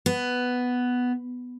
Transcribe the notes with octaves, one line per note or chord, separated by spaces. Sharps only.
B3